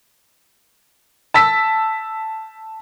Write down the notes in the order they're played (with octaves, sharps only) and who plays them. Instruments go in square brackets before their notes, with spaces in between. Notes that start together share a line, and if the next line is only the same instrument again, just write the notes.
[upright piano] A5 E6 B6